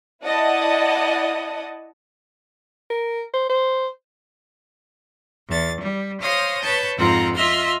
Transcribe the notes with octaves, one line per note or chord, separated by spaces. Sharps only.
E4 D5 D#5 F#5 A5 D#6
A#4
C5
C5
E2 A6
G3
C5 C#5 F5 D#6 F6 A#6
B4 C#5 A5 G6
F2 G#2 C4 F4 F#5 A#5
F4 D#5 E5 C6 F6